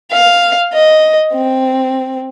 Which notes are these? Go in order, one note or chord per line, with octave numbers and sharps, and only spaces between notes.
F5
D#5
C4